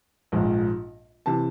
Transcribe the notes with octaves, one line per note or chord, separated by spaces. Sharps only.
A#1 G#2 F3
C3 E3 A5